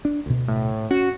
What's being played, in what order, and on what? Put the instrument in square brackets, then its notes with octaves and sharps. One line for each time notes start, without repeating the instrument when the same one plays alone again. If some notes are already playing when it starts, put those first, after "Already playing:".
[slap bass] D4
D2 B2
[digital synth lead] A2
[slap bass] C#4 [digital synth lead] F#4